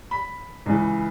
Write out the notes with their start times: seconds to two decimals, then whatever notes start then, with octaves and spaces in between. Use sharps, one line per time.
0.11 B5
0.66 C#2 C#3 E3